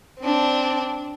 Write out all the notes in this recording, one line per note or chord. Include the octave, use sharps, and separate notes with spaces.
C4 D4